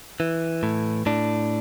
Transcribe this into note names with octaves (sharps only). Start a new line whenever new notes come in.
E3
A2
A2 D4